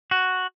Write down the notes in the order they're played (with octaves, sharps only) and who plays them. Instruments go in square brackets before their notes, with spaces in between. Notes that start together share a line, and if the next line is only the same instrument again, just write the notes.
[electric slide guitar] F#4